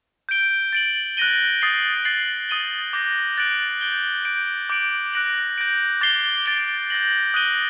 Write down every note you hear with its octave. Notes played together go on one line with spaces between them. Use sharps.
G6 D7 G7
A6 D7 F#7
F#6 A#6 D#7 G7
D#6 A6 C7 F#7
A6 C7 F#7
D#6 A6 D#7 G7
D6 G6 A#6
F#6 A6 D7 F#7
G6 D7 G7
G6 D7 G7
D6 G6 D7 F#7
F#6 A#6 D7 F#7
G6 A#6 D7
D6 A6 C7 G7
A6 D7 G7
G6 A#6 F#7
D#6 F#6 A#6 D#7 G7